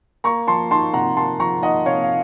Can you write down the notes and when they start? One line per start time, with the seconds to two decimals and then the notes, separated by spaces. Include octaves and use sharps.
0.24 A#3 A#5 C#6
0.47 F3 A5 C6
0.71 D#4 A5 C6
0.94 C3 F#5 A#5
1.17 A#3 A5 C6
1.39 F3 A#5 C#6
1.63 D#4 D#5 F#5
1.86 C3 C#5 F5
2.03 F5